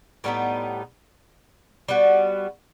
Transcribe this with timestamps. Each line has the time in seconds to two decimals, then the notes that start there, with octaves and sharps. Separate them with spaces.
0.24 A2 G3 B3 D#4
1.88 G3 B3 F#4